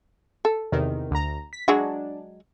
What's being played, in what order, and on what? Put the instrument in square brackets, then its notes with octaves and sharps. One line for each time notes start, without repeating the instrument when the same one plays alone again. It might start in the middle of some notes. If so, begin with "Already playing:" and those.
[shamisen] A4
[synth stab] E2 C3 D#3
D2 A#5
B6
[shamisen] F#3 G#3 F#4 [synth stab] D4